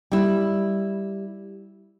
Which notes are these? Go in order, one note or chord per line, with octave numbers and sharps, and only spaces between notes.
G3 E4